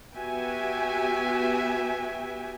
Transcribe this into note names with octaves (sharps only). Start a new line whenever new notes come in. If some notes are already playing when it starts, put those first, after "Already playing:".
B3 F#4 G4 E5 G5 G#5